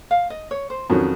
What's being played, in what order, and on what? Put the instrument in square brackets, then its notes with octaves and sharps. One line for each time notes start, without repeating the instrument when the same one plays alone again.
[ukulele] F5
D#5
C#5
C5
[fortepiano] F2 D#3 F#3 C#4 [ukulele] C#5